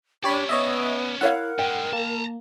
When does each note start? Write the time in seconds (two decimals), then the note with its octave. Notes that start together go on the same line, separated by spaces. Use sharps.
0.24 C#4 D4 G4 C#5 D5 B5
0.49 B3 C#5 D#5 E5
1.21 E4 A#4 C#5 F5 F#5
1.59 G2 G#3 G5
1.93 A#3 A5 A#5